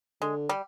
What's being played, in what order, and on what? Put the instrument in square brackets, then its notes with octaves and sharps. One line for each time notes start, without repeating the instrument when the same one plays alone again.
[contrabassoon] D3 [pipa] G#3
[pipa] G3